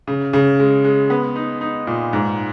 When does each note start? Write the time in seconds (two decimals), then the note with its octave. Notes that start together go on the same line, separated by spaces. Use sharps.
0.07 C#3
0.33 C#3
0.59 G#3
0.84 G#3
1.10 B3
1.36 D#4
1.61 D#4
1.87 A#2
2.13 G#2